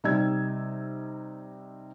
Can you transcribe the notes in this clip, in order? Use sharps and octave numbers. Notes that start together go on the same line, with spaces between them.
C3 G3 D#4 D5 E6 G#6